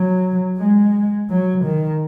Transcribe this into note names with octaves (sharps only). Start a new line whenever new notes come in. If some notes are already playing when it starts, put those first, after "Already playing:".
Already playing: F#3
G#3
F#3
D#3